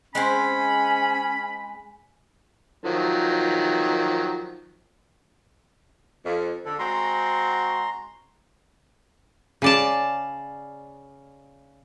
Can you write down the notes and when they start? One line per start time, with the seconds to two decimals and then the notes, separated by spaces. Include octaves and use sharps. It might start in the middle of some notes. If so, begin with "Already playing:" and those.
0.15 G#3 C4 C#4 C5 G#5 B5
2.84 D#3 F3 F#3
6.25 F2
6.65 D3 A4
6.79 G#3 C4 F#4 A#5 C6
9.62 C#3 D5 A5